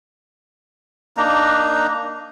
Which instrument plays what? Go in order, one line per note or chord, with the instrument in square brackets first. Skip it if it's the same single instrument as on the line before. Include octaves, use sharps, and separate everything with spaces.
[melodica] A#3 D4 D#4 A#5